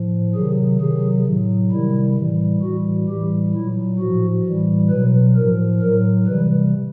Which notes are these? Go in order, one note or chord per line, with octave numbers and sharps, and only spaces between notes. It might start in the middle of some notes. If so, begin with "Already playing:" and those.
Already playing: A2 F3
C3 D#3 F#3 G#4
C3 D#3 F#3 G#4
A2 F#3
C3 D#3 G3 E4
A2 E3 G3
A2 E3 G3 F#4
A2 E3 G3 G4
A#2 F#3 E4
A2 F3 F#4
A2 E3 G3
B2 F#3 B4
A2 F3 A#4
A2 F#3 A#4
C3 E3 G3 B4